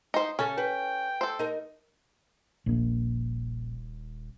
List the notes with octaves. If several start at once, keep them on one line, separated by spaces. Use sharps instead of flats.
D#4 C5
C#3 C#4 A4
B4 G5
A4 C5
D#4 A#4
D#1 A#1 A#2